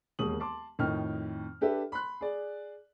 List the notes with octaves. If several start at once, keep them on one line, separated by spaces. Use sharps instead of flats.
E1 D#2 G#3 D#6 F#7
A5 C6 D6
F2 A2 D#3 D#5 G5 F6
D4 G4 A4 B4 E5
B5 C6 F#6
G#4 D5